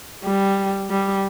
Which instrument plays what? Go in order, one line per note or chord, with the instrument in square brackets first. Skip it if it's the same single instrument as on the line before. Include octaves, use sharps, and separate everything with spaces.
[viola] G3
G3